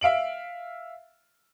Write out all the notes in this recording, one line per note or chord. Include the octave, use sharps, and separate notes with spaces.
E5 F5 D7 F#7